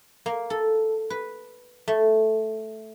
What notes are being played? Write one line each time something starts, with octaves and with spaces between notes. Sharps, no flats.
A#3
A4
B4
A3